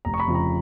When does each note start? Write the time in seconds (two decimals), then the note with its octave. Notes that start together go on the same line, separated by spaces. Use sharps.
0.05 F1 A#5
0.14 C#6
0.20 B5
0.28 F2 C#3 F3
0.35 A#5